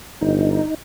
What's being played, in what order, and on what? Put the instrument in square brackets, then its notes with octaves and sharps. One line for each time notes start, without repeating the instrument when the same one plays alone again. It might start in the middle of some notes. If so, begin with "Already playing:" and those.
[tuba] G1 [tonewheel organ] D#4